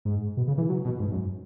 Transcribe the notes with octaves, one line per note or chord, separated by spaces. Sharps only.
G#2
B2
C#3
E3
F#3
B2
G#2
F#2